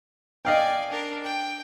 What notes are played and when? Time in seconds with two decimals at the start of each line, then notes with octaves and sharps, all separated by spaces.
0.45 D5 D#5 F5 G5 G#5
0.90 D4 A#4
1.24 G5